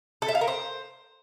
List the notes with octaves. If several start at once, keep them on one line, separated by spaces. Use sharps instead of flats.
A4
E5
F5
A#4
C5